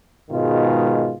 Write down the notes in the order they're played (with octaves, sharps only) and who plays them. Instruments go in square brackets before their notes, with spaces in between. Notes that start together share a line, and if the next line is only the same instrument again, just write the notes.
[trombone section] G#2 B2 D#3 G#3 F4